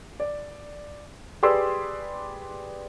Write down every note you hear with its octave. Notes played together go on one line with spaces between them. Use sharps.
D5
G4 G#4 B4 D5 C6 E6